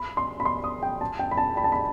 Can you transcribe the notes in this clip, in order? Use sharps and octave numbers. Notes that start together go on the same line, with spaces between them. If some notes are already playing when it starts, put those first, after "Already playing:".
Already playing: B5
C6
B5
C6
D#6
G5
A5
G5
B5
A5
B5
A5
B5